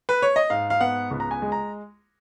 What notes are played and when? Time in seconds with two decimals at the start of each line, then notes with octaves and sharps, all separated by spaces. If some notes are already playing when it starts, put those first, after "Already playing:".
0.09 B4
0.22 C#5
0.36 D#5
0.50 G#2 F5
0.70 F5
0.81 B3 F#5
1.11 C#2
1.20 A#5
1.31 G#5
1.42 G#3
1.52 A#5